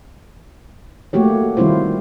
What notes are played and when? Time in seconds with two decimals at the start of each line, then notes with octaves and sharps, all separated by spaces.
1.13 A3 A#3 F#4 G4 C#5
1.57 D#3 G3 C4 E4 F4 C5